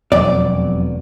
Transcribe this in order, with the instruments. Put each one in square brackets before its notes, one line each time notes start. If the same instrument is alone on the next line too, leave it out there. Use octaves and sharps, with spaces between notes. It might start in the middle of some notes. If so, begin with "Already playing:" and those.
[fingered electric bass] E1 B2 [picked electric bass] F2 F#3 [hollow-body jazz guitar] D5